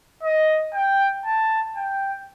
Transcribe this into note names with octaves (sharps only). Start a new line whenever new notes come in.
D#5
G5
A5
G5